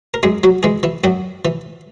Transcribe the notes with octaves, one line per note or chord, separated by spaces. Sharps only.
A#4
F#2 G#3 G#4
F#3 F#4
E3 G#3 G#4
E3 E4
F#2 F#3 F#4
E3